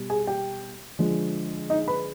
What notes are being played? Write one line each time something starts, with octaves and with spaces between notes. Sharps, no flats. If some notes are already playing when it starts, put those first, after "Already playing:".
Already playing: B2 G3
G#4 G#5
G4 G5
D3 F3 G#3
D#4 D#5
B4 B5